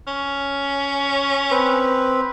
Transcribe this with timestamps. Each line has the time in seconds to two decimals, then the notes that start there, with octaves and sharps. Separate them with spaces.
0.07 C#4
1.51 C4 B4